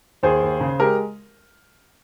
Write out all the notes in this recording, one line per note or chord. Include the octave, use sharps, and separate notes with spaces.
D#2 G#4 C5
D#2
C#3
G#3 G4 A#4